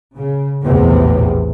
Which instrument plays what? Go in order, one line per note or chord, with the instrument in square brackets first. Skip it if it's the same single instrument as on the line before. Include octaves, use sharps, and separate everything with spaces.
[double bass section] C#3
A#1 E2 A2 C3